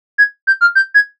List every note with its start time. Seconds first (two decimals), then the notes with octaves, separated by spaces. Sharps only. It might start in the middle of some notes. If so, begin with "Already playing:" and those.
0.18 G#6
0.47 G6
0.61 F6
0.75 G6
0.94 G#6